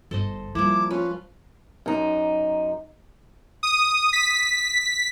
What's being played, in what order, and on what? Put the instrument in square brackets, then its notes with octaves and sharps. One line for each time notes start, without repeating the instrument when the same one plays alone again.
[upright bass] G1 [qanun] A4 C5 D#5
[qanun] F3 A#3 [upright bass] G3 [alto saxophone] E4 [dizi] D6
[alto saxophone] C#4 [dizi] F4 [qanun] B4
[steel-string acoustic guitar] F#2 D#4
[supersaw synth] D#6
B6